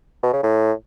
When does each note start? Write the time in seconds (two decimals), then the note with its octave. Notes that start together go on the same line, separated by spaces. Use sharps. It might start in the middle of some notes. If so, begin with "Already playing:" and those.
0.23 B2
0.33 C#3
0.43 A2